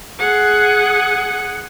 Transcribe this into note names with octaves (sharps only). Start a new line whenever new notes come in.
G#4 F#5